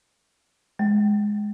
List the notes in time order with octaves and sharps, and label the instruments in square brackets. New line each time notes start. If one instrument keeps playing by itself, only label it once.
[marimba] G#3